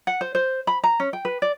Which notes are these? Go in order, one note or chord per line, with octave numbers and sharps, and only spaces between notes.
F#5
C5
C5
B5
A#5
C#4
G5
B4
D5